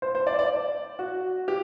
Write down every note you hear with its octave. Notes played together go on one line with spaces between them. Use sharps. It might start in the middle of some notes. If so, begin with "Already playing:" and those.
C5
C5
D5
D5
F#4
G4